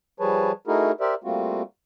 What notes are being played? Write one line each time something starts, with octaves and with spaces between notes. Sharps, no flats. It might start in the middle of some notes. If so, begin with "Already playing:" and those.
F3 G3 G#4 B4 C#5 A5
A3 D#4 E4 F#4 G#4 A#4
G4 A#4 C5 D5 E5
G3 A3 A#3 C4 F4 F#4